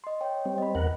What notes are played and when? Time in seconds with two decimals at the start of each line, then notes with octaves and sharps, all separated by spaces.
0.04 D#5 C6
0.21 C#5 G5
0.45 G3 C4
0.58 D#5 B5
0.75 E2 A#4 F#5